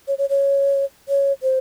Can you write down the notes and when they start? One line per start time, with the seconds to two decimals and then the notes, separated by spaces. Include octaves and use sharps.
0.08 C#5
0.18 C#5
0.29 C#5
1.09 C#5
1.43 C5